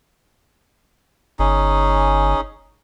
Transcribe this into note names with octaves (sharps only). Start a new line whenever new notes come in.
G1 C#4 D#4 G#4